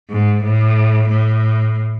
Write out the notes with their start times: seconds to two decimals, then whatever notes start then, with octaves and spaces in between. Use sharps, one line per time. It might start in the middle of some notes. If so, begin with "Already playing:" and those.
0.10 G#2
0.44 A2
1.09 A2